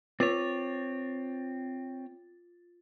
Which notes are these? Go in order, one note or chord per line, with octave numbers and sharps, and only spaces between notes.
C4 F4 C#5 A6